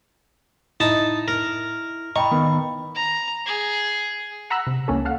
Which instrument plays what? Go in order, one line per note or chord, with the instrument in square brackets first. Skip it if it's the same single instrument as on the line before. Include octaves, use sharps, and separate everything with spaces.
[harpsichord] D#4 A5 [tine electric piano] E4
[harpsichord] A#4
[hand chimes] D#5 G5 B5 [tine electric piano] A#5 [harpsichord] C#6
[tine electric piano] D#3 [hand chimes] B3
[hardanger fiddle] A#5
G#4
[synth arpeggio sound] F#5 A#5 B5 E6 F#6
C3
C#2 A#3 C#4 A4
A4 F5 F#5